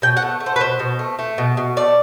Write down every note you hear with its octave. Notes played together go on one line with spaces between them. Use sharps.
B2 G5
F#5
A3
A3
C5
B4
B2 C5
B2
A3
A3
B2
B2
A3 D5